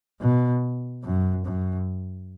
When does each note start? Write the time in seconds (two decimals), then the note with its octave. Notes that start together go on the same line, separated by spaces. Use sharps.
0.21 B2
1.05 F#2
1.46 F#2